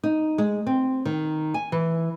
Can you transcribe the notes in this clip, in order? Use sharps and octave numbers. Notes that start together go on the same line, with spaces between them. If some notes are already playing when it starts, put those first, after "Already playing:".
D#4
G#3
C4
D#3
G#5
E3